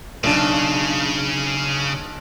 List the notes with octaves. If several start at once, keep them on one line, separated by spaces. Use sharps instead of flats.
B1 C#3 D4